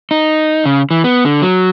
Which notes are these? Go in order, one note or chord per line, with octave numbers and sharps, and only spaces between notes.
D#4
C#3
E3
B3
D3
F#3